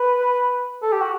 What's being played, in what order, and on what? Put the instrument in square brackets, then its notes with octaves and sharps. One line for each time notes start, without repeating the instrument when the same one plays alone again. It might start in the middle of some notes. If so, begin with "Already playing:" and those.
Already playing: [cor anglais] B4
A4
G4
F#4